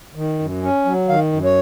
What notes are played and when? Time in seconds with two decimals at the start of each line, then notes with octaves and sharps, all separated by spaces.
0.15 D#3
0.39 F#2
0.63 C#4
0.85 F#3
1.08 D#3 F5
1.33 F#2
1.44 C#5